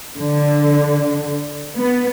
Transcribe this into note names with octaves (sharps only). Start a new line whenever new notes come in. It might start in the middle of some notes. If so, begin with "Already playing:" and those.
D3
B3